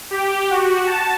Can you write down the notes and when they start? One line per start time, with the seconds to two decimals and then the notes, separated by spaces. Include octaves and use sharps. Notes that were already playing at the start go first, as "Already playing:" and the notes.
0.11 G4
0.50 F#4
0.87 A5